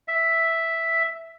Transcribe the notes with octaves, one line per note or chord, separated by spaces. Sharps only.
E5